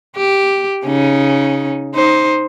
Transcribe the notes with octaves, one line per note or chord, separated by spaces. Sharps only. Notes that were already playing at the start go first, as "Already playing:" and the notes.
G4
C#3 C#4 D#4
D#4 C5